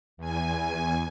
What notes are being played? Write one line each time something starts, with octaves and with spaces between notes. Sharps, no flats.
E2 G#5